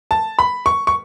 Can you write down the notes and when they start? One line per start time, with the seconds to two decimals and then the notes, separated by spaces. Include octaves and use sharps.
0.11 A5
0.39 B5
0.66 C#6
0.87 C#6